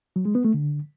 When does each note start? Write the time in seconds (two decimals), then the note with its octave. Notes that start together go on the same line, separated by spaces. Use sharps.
0.16 F#3
0.25 G#3
0.35 B3
0.45 A3
0.54 D3